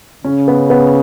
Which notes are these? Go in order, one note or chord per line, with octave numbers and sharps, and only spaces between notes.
C#3 C#4
B3
B3